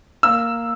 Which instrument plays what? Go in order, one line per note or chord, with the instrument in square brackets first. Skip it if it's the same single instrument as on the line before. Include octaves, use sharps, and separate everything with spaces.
[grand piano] A#3 E6